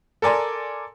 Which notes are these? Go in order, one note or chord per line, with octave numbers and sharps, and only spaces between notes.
A4 A#4 D5 G#5 C6